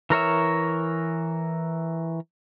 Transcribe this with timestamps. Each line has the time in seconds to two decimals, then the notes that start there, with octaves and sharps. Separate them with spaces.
0.10 E3 A#4 C#5 E5